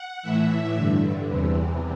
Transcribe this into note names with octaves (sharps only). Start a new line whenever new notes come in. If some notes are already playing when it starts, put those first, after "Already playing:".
Already playing: F#5
A2 E3 E5
G2 D3
E2 C3 E3